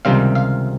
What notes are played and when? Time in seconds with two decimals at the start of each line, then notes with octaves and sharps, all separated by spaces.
0.05 C#2 C3 D#3 G3 C4 F5
0.35 F5